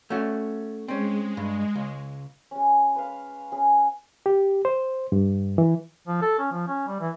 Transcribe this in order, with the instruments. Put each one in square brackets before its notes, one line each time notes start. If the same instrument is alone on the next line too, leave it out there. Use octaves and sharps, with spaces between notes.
[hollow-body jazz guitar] A3 C#4 F#4
[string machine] G#3 [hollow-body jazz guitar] C4 C#4
[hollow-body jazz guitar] G2
C#2
[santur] G#3 C#4
B4 F5
C#4 G#4
[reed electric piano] G4
C5
G2
E3
[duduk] F3
A4
C#4
F3
C#4
G3
E3